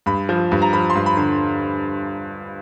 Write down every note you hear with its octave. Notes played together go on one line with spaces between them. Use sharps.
G2 B5
F3
G2
A#5
F3 B5
C6
G2
B5
D3